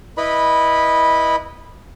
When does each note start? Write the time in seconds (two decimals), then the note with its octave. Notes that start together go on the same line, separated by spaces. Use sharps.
0.17 E4 B4 D#5 B5